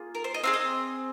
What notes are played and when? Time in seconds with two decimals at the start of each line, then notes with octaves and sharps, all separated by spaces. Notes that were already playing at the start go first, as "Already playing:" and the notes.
Already playing: A#3 F4 G#4
0.15 A#4
0.24 C5
0.34 D#5
0.43 C4 D#4 G#4 F5
0.54 D#5